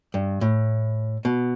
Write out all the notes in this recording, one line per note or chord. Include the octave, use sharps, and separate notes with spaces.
G2
A2
B2